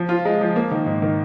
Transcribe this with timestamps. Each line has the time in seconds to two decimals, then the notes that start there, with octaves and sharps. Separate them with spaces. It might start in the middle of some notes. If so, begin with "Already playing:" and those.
Already playing: F3
0.09 F4
0.25 G#3
0.41 F3
0.56 A#3
0.71 D#3
0.86 G#2
1.02 D#3